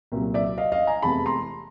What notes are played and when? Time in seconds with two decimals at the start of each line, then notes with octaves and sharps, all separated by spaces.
0.12 C2 A#2 F#3
0.34 D5 E5
0.58 D#5 F5
0.72 D#5 F5
0.87 G#5 A#5
1.02 F1 E2 C3 E3 G#3 A5 B5
1.26 A#5 C6